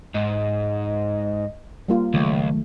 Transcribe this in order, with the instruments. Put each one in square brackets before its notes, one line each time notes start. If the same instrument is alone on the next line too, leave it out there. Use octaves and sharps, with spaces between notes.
[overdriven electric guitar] G#2 [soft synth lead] D#5
[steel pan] G3 A#3 F4
[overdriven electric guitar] C#2 [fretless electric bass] D#3 F#3 G#3 [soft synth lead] A3